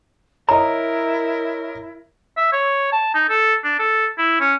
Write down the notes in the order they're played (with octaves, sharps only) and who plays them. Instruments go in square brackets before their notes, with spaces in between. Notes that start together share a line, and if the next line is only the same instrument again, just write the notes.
[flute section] E4 [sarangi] A#4 [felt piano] C#5 D#5 [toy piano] A#5
[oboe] E5
C#5
A5
D#4
A4
D4
A4
E4
C#4